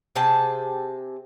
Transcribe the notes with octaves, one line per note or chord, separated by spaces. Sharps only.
C3 G#4 G5 A5